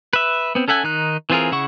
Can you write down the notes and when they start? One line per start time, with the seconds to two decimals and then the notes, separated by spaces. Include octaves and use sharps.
0.13 B4 E5
0.55 B3 C4
0.68 C#4 A4 E5 F#5 G#5
0.84 D#3 D#4 F#6
1.30 E3 C4 F4 G#4 A#4
1.52 C#3 E4 F#5 C#6